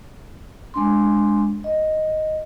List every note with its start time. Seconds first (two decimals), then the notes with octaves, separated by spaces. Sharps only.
0.74 G#3 D4 C6
1.64 D#5